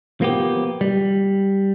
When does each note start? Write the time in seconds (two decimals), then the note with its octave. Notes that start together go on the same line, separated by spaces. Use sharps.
0.21 F3 A#3 B3 G4
0.81 G3